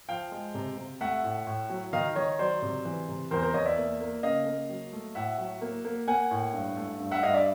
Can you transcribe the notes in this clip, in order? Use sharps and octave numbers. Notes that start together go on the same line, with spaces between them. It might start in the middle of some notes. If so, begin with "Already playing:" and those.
F3 F5 G5
G#3
C3
C3
A3 E5 F#5
A2
A2
F#3
D#3 D#5 F5
D#3 C#5 D#5
F#3 C5 D5
C3
E3
C3
E2 A#4 C5
A#4 C5
E2 C#5 D#5
D5 E5
A#3
A#3
C#3 D#5 F5
A#3
F#3
A3
A2 E5 F#5
F#3
A#3
A#3
A#3 F#5 G#5
A2
G2
A3
G2
E5 F#5
G2 D#5 F5
D5 E5